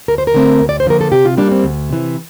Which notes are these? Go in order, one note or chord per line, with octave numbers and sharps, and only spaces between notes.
D2 A#4
C5
A#4
D3 A3 C4
D2
D5
C5
D3 F3 A#3 A#4
A4
C3 G4
F4
G3 A#3 D4
C4
D2
C3 E3